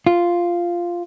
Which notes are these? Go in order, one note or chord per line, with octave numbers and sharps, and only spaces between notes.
F4